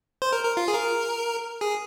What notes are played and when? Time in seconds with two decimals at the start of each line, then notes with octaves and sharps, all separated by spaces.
0.22 C5
0.33 A#4
0.44 A#4
0.57 F4
0.68 G#4
0.74 A#4
1.61 G#4